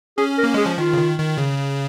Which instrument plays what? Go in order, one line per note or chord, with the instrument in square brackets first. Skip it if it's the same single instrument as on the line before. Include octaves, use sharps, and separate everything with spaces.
[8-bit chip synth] C#4 [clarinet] G#4
[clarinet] A#4
[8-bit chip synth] A#3
[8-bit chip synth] G#3 [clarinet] G#4
[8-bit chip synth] F3
[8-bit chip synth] D#3 [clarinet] F4
[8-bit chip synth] C#3
D#3
D#3
C#3